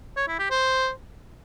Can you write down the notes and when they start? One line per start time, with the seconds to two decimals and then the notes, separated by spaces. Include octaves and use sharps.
0.17 C#5
0.28 E4
0.39 G4
0.51 C5